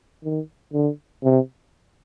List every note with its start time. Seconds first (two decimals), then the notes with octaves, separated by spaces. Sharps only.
0.24 D#3
0.73 D3
1.24 C3